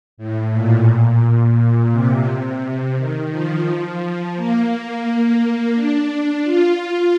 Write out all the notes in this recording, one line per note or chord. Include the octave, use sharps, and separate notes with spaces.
A2
A#2
A#2
A#2
A#2
C3
D#3
F3
A#3
D4
F4